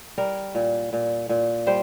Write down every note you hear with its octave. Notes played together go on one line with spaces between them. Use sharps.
G3 A#4
A#2
A#2
A#2
G3 C5